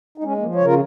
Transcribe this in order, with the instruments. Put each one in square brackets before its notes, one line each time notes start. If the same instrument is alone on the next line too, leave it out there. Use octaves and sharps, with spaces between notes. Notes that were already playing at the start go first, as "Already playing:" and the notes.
[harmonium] D#4
G#3 C#4
A#3
F3
C#3 C#5
F4 A#4